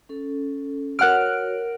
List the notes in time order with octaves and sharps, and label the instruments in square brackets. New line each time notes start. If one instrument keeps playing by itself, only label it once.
[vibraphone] C#4 A4
[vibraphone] F#4 C#5 [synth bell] A#4 F#5 D7 [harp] F6 F#6